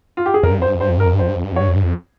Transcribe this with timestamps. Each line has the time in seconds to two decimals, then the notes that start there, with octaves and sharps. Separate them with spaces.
0.17 F4
0.26 G4
0.34 G#4
0.43 F2 A#4
0.51 G2
0.59 F2
0.62 C5
0.67 G2
0.75 F2
0.81 G2 C5
0.89 F2
0.98 G2 A#4
1.05 F2
1.13 G2
1.19 F2 C5
1.29 G2
1.36 F2
1.44 G2
1.52 F2
1.56 G2 C#5
1.68 F2
1.76 G2
1.83 F2